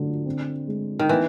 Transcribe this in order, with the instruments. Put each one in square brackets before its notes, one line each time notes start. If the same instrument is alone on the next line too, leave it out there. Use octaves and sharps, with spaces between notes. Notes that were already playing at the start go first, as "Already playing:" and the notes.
Already playing: [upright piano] D3 F#3
C4
G#3
[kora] D#3
[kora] E3 [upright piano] B3